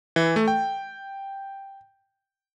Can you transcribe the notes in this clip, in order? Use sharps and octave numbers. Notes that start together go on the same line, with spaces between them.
E3
A3
G5